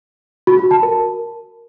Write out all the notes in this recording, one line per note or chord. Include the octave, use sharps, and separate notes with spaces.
F#4
F#4
A5
A#4